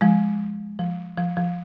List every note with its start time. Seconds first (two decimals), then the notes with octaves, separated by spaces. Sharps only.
0.01 F3 G#3
0.79 F3
1.18 F3
1.37 F3